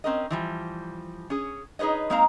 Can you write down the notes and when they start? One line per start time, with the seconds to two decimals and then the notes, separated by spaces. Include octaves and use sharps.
0.04 C4 C#4 A#4 D#5
0.30 E3 F3 G3
1.30 C#4 G#4
1.79 D#4 G#4 B4 C#5 D#5
2.10 G#3 A#3 C4 D#4 F5 A#5